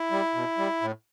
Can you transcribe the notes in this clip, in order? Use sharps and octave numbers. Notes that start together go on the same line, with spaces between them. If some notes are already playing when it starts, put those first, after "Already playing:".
Already playing: E4
G3
B2
G3
A2